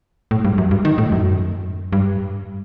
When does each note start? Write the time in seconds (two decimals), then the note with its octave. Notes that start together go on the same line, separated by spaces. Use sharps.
0.31 A2
0.45 G2
0.58 F#2
0.71 G2
0.85 D#3
0.98 A2
1.12 F#2
1.93 G2